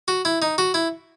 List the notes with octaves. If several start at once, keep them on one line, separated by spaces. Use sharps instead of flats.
F#4
E4
D#4
F#4
E4